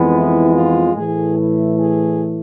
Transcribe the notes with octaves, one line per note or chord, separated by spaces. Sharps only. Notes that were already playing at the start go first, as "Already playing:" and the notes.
Already playing: F2 E3 G#3 B3
E4
F4
A2 E3 A3 G#4
E4
G#4